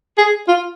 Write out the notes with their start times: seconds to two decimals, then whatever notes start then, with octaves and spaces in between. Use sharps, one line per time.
0.18 G#4
0.48 F4